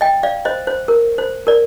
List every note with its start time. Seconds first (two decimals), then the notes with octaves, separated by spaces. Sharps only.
0.01 D#5 G5
0.23 D5 F5
0.45 C5 D#5
0.67 C5
0.88 A#4
1.18 C5
1.47 A#4 D5